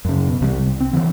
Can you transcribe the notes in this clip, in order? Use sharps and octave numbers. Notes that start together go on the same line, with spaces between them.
F#2 C#3
B2
C2 C3 G3
C2
C4
D3 E3 B3 C4